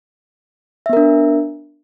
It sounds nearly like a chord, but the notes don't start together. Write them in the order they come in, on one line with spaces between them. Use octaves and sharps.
E5 B3 A#4 D4